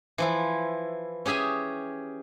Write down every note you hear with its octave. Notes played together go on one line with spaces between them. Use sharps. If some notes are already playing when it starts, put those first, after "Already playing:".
E3 F3 E4
C#4 G4 G#4 E5 G#5